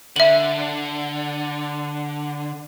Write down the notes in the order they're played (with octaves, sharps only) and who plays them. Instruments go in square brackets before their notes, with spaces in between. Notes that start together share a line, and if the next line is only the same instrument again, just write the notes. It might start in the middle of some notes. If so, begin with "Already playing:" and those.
[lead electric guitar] D3 [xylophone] E5 F#7